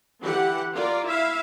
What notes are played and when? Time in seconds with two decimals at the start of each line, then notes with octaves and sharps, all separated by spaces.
0.21 D3 E3 G4 F#5
0.73 F4 A#4 D5
1.05 E4 E5 F5